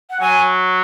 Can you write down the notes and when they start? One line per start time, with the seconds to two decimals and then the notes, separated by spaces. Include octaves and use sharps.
0.10 F#5
0.21 F#3 G#5